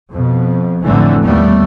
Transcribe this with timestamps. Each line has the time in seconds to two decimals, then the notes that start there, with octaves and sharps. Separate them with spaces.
0.10 F2 B2
0.83 A1 F2 A2 D3 E3 A3
1.23 D#2 G3 A3 B3